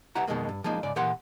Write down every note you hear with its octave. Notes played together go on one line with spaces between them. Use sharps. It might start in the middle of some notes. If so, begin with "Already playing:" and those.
C2 E4 G4 B4 F#5 A#5
B1 F2 B2 D#3 G#3 A#3
G2
F3 G#3 A#3 D#4
G#2 C#3 D5
A#2 E3 G4 A#4 F#5 C6